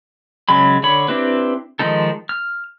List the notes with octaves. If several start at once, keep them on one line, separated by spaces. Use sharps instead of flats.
C#3 F#3 G#3 B5
D3 C#5 B5
C4 D4 E4 G4 B4
D#3 F3 G#3 D#4 A4
F6